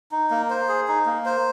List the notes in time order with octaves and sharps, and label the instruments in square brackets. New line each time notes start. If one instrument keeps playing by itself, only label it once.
[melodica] D#4
A#3
C5
G#4
D#4
A#3
C5